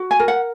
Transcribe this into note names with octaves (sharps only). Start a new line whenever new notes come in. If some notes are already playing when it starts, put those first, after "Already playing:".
Already playing: F#4
G#5
A#4
F#5